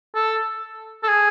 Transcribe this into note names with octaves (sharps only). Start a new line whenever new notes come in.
A4
A4
G#4